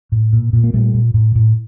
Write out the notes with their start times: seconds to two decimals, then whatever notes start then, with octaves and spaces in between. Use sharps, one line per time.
0.12 A2
0.33 A#2
0.53 A#2
0.64 A#3
0.73 A#2 G3 A3
0.94 A#2
1.14 A2
1.35 A2